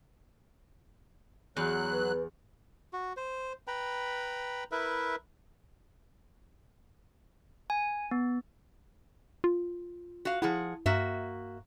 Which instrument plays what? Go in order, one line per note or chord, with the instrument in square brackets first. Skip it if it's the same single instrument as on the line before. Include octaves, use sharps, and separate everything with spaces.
[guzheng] E2 [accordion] F#3 F#6
[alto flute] B4
[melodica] F#4
C5
B4 G5 A#5 B5
E4 A#4 B4 E5
[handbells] G#5
B3
[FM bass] F4
[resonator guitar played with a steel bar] F#4 F5
[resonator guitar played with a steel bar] F3 G#4 F#5 [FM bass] E4
[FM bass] G2 [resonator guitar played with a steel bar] A#3 F#4 E5